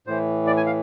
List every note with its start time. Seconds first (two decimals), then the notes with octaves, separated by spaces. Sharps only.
0.07 A2 E3 C5
0.47 D5
0.57 G#5
0.66 F5